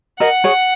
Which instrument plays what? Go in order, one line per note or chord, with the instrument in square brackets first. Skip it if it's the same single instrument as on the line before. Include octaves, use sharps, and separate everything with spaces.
[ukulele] A#4 D#5 [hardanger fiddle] F#5
[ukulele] G#4 C#5